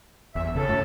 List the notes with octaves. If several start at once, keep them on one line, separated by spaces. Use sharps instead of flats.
G1 E2 E5
A2 C#3 A4
F#2 A3